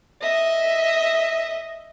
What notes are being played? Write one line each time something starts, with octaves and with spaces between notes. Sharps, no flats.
D#5 E5